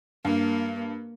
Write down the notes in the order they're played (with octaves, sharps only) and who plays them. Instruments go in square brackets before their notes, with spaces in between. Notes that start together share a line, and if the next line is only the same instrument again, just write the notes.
[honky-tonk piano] G2 [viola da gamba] A#3